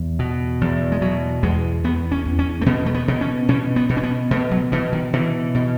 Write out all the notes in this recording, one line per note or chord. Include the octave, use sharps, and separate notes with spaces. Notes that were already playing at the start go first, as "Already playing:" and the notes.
Already playing: E2
B2
E2
G#3
B2 F#3
E2 G#3
E2 B3
C#4
E2
C#4
A3
B2 B3
A3
B3
B2
C#4
B2 C#4
B3
B2
C#4
B3
B2 A3
F#3
B2 E3
D#3
B2 E3
B2